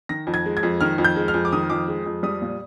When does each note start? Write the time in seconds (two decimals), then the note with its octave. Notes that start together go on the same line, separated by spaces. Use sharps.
0.09 D#3 A#6
0.27 F2
0.34 G#6
0.46 G#3
0.57 G#6
0.63 F2
0.81 D#3 F6
0.98 F2
1.04 G6
1.16 G#3
1.28 F6
1.34 F2
1.45 D6
1.52 D#3 D#6
1.70 F2 D6
1.88 G#3
2.06 F2
2.23 G3 D#6
2.42 A#2